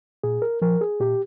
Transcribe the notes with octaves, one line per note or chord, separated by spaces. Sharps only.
A#2 G#4
A#4
F3 A#4
G#4
A#2 G4